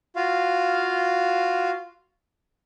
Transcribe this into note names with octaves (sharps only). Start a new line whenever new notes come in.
F4 F#4 F5